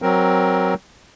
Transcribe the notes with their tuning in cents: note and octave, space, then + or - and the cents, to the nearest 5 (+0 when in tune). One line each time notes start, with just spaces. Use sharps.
F#3 +10 C4 +15 A#4 +15